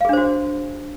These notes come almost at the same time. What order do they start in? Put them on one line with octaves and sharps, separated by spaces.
F5 G#4 D4 C5 F#4